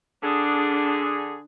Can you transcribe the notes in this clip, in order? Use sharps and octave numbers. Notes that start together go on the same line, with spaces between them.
D3 D4 G#4